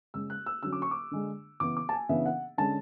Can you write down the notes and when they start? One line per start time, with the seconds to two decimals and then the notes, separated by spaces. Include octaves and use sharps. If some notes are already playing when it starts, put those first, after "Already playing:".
0.14 C#3 G#3 C#4 E6
0.30 F#6
0.46 E6
0.63 D3 F#3 C#4 E6
0.73 D6
0.82 C#6
0.91 D6
1.11 D3 G#3 D4
1.60 C#3 E3 B3 E4 D6
1.77 D6
1.89 A5
1.93 G#5
2.09 C#3 E3 B3 D4 E5
2.26 F#5
2.58 D3 G#3 C#4 A5